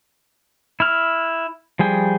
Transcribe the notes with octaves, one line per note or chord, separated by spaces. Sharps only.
E4 F6
F3 G3 G#4 G5